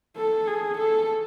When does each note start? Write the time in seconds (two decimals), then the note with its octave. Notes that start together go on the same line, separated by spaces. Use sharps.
0.17 A4
0.47 G#4
0.78 A4